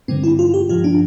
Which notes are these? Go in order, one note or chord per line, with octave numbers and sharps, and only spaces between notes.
G2 D3 G3 C4
E4
F4
G4
G2 F3 F4
D4